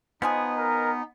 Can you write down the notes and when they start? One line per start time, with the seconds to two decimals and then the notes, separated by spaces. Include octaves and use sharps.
0.22 F3 G#3 B3 D#4 G#4 B4
0.57 A#4